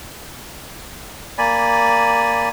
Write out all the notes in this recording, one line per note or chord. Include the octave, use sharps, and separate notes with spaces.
A#3 D5 G#5 B5